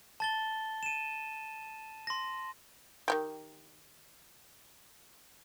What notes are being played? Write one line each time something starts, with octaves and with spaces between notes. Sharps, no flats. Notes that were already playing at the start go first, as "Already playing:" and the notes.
A5 A6 G7
D#7 E7
C6 A#6
D#3 F#3 G4